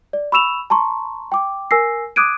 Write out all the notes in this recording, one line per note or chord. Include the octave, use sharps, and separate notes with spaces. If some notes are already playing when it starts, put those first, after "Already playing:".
D5
B5 C#6 E6 E7 F7
A5 A#5 C6 C#6
G5 D6
A#4 G#5 E6 A#6 C7
D6 D#6 F#6 G#6 D7 D#7